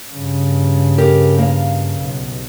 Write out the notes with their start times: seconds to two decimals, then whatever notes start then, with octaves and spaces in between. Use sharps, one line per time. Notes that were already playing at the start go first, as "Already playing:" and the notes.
0.11 G2 C#3
0.98 G4 A#4
1.38 A#3 F5
2.00 B1